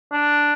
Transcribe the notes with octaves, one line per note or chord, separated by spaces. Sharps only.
D4